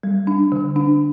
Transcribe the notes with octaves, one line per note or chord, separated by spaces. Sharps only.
G3
D4
D3
D4